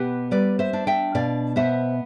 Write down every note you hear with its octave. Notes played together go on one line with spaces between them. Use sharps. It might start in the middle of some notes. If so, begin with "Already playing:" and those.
Already playing: B2 B3 G4 B4
G3 B4 D5
C5 E5
D4
E5 G5
B2 D5 F5
B3 C5 E5